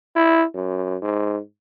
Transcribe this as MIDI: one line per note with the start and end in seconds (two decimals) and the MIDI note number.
0.16 0.44 64
0.54 0.97 42
1.02 1.39 44